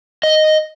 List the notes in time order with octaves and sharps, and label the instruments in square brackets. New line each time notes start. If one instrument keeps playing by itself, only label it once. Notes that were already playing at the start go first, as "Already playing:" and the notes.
[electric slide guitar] D#5